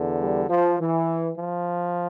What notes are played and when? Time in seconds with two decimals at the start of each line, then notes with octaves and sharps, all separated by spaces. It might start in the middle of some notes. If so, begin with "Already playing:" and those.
Already playing: E2 D3
0.21 G3
0.50 F3
0.80 E3
1.38 F3